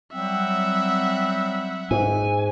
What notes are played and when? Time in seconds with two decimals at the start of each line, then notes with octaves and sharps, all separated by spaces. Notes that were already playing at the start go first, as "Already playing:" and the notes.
0.13 F#3 G3 C4 E5 F#5
1.91 G#2 G#5